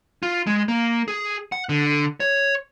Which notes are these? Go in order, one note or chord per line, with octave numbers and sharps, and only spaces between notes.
F4
G#3
A#3
G#4
F#5
D3
C#5